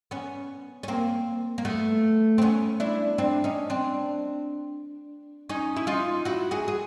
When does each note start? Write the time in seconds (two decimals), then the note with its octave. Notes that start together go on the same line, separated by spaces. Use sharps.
0.11 B3 C#4
0.83 C#4
0.88 A#3 C4
1.58 A#3
1.65 A3 B3
2.38 C4
2.42 B3 C#4
2.80 D4 E4
3.18 C4 D4
3.44 C#4 D#4
3.70 C4 D4
5.49 C#4 D#4
5.76 E4
5.87 D#4 F4
6.25 E4 F#4
6.51 F#4 G#4
6.68 G#4